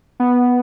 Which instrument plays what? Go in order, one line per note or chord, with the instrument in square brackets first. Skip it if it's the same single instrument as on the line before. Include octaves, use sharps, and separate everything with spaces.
[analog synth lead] B3